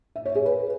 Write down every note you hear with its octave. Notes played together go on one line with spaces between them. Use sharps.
E5
C#5
G#4
B4